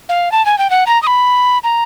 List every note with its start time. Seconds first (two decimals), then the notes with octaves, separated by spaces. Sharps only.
0.09 F5
0.32 A5
0.46 G#5
0.58 G5
0.70 F#5
0.87 A#5
1.02 D#6
1.07 B5
1.64 A#5